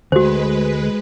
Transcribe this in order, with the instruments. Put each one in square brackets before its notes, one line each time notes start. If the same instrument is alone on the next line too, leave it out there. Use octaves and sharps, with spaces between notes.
[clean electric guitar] D2 [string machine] G#3 B4 [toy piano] F#4 C5